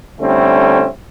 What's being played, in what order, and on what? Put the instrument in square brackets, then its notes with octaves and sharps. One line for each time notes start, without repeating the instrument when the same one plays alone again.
[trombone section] D3 G3 A3 C4 C#4 E4